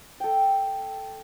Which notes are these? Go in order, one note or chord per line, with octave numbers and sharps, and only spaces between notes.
A4 G5